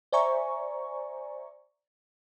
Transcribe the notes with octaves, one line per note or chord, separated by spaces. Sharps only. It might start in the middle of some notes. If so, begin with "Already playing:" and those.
C5 D5 E5 G#5 A#5 C#6